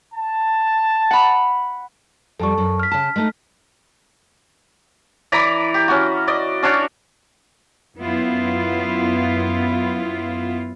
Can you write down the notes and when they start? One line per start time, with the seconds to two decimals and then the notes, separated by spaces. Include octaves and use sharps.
0.14 A5
1.11 F#5 B5
2.40 F2 G3 A4 A5 C#6
2.58 F#2
2.80 F6 B6
2.91 C#3 A5
3.16 G#3 A3 D#4
5.32 E3 D5 A#5 B5
5.74 G4
5.88 C#4 F#4
6.27 D5 D#5
6.63 C#4 D4 F#4 C#5
7.99 F#2 B3 E4 F4